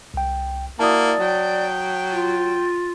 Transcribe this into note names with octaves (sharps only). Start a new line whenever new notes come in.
C2 G5
A#3 E4 F#4 D5 A5 D#6
F#3 G5
F4